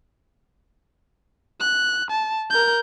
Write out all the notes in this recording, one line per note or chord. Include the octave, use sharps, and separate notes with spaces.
F#6
A5
A#4 G6